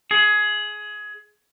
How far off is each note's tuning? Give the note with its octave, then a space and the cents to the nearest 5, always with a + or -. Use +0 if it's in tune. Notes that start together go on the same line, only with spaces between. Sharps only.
G#4 +20